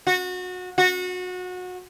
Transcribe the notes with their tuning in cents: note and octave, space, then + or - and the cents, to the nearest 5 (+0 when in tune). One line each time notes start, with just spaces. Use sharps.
F#4 -25
F#4 -25